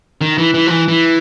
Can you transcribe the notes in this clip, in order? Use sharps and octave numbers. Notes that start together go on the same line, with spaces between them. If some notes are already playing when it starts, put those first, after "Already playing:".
D#3
E3
E3
F3
E3
E3